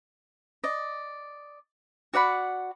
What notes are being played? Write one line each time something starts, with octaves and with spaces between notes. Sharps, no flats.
D5 D#5
F#4 D5 F#5 B5